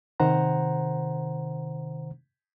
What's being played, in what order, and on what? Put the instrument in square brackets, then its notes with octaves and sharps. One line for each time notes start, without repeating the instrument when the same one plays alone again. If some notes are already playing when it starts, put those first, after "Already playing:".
[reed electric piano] C3 D#3 C5 F#5 A#5